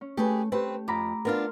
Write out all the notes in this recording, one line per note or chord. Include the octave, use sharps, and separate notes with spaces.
C#4
A3 G4 G#4 B4
A3 C4 G4 B4
F2 A#5 B5 D6
B3 D4 F4 A#4 C6 F6